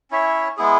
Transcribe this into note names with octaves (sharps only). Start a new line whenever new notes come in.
C#4 E4 C#5 E5
G#3 B3 E4 G#4